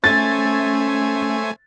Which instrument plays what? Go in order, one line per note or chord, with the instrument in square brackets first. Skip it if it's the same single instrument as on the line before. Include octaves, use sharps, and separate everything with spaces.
[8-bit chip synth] A3 G#5 [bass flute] C#4 [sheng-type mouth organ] C5 C#5 E5 [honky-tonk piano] A6